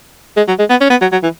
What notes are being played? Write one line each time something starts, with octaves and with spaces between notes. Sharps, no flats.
G#3
F#3
G#3
B3
C#4
B3
F#3
F#3
E3